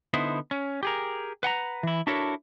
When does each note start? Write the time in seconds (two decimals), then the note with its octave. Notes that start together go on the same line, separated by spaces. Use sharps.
0.14 D3 B3 D#4 E4 C5
0.51 C#4
0.83 G4 G#4 A#4
1.43 B4 F#5 G5 A#5
1.83 E3 E4
2.07 D4 E4 F#4 A4 A#4 C#5